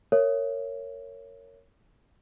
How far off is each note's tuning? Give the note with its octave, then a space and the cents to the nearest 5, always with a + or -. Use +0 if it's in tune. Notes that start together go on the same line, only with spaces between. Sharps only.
A#4 -20 C#5 +0 E5 +25